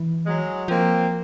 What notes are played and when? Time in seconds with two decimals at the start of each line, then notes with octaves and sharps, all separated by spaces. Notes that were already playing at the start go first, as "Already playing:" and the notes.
Already playing: E3
0.27 F#3 G#3
0.68 F3 A#3 C4